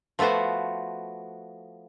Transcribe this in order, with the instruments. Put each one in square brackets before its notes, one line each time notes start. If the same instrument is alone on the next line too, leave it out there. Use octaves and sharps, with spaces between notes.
[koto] F3 A3 B3 F#4 C5